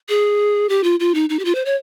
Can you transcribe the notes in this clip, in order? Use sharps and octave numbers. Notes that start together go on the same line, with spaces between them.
G#4
G4
F4
F4
D#4
D#4
G4
F4
C5
C#5